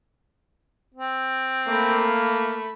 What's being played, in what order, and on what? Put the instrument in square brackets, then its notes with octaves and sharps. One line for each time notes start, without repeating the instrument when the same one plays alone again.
[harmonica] C4
[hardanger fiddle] A3 B5 [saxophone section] A#3